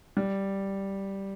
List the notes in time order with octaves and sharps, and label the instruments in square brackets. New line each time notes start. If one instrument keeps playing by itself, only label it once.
[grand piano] G3